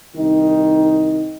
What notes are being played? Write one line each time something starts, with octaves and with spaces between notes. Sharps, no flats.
C2 D#3 D#4